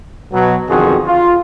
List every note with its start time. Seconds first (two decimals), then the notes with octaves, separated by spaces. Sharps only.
0.33 B2 F#3
0.69 B1 F2 D3 D#3 F#4 G#4
1.06 F4